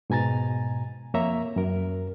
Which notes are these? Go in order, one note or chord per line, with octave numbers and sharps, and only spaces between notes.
G#2 B2 G#5 A#5 A6
F2 A#3 C#5 E5 A#5
F#2 A#4